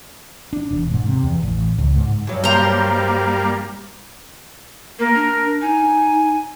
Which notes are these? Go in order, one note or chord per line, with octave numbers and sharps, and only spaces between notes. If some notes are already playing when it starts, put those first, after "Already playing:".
D4
E1
G#2
C3
E2
A1
C#2
G#2
G2 F#3
G3 A#3 C5 A#5
A#3 A#4
D4
D#4 G#5